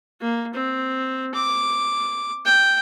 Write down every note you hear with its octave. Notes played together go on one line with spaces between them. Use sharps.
A#3
C4
D6
G5